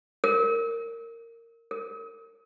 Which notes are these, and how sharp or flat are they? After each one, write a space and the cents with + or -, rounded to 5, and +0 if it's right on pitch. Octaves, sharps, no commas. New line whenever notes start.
A#4 -15
A#4 -30